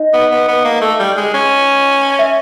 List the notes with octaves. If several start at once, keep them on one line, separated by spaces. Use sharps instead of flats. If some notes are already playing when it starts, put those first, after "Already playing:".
Already playing: D#4 D#5
B3
B3
B3
A#3
A3
G3
G#3
C#4
E5